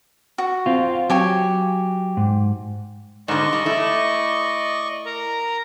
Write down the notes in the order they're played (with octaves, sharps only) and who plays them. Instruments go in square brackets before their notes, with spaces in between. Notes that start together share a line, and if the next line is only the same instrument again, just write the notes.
[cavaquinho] F#4
[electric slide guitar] C4 F4
[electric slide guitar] F#3 [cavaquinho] G4 G#5 C#6
[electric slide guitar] G#2
[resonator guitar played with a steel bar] G#2 B2 D3 [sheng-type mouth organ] D5 D#5 C#6
[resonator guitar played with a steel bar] G3
A3 E4
[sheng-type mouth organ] A#4 A#5